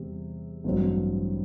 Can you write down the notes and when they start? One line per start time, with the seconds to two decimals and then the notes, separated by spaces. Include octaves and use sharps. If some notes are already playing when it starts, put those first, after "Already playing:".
Already playing: E2 C3 G3
0.64 A1 G2 F#3 C4